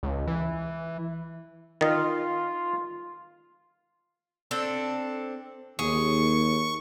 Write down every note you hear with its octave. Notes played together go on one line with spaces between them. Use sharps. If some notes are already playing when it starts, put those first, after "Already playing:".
C#2
E3
D#3 F4 D#5
C4 D4 A4
D#2 G#4 C#6